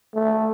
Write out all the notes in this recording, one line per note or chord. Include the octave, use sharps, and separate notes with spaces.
A3